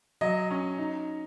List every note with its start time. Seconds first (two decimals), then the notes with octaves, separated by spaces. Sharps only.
0.21 F#3 D#5
0.51 C#4
0.78 D#4